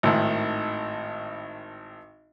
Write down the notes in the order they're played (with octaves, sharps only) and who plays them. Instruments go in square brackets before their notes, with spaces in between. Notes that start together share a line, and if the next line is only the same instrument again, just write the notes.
[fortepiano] G#1 A2 D#3 E4 A5